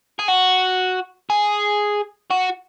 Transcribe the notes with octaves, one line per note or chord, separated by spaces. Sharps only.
G#4
F#4
G#4
F#4